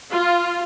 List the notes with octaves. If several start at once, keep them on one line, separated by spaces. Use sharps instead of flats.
F4